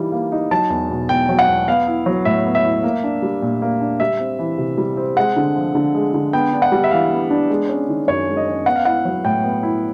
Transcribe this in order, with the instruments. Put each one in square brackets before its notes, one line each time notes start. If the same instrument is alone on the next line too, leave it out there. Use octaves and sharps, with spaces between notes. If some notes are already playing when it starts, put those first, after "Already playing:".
Already playing: [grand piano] E3 G3 A#3 D#4
A#3
D#4
F#3 A5
E2
B2
E2 G5
F#3
F#5
E2
B3 F5
E4
F#3
A2 E5
B3
E5
E4
A#3
D4
G3
A#2
A#3
D4
G3 E5
C4
E3
C3
G3
C4
G#3 F#5
D3
F3
D3
G#3
D3
B3 G5
D4
F#5
G3
E5
E3 F5
B3
D4
G#3
C#4
D#3
F#2 C#5
G#3
D#5
C#4
B3 F#5
F5
E4 F#5
F#3
A2 G5
B3
E4